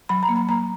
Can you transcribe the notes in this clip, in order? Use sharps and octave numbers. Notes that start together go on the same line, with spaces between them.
F#3 B5
A#5
A#3
B5
A#3 A#5